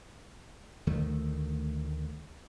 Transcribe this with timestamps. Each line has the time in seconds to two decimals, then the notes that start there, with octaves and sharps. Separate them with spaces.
0.87 D2 D#3 A3